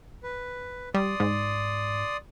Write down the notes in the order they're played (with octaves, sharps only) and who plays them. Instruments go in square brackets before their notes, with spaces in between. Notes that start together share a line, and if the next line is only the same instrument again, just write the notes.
[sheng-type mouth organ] B4
[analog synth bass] G3 [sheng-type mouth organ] D5 C6 D#6
[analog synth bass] G#2